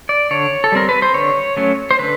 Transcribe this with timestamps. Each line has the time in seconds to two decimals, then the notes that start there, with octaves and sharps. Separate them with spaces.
0.09 D5
0.31 D3 C#5
0.64 A4
0.72 G3 C4 A#4
0.89 B4
1.02 C5
1.14 D3 C#5
1.57 F#3 A3 C#4
1.91 C5
1.99 D3 B4